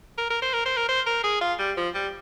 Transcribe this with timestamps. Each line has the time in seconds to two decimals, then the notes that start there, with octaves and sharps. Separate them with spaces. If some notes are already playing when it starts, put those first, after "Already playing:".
0.18 A#4
0.30 A#4
0.42 C5
0.54 A#4
0.65 C5
0.77 A#4
0.89 C5
1.06 A#4
1.24 G#4
1.41 F4
1.59 G3
1.77 F3
1.95 G3